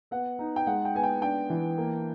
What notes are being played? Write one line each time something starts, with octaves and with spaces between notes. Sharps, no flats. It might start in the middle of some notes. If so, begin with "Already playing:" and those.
B3 F#5
D#4
G5
G#3 F#5
G5
B3 G#5
G5
D4 G5
E3
A#3